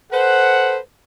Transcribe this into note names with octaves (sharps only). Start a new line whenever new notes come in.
A4 B4 C5 F#5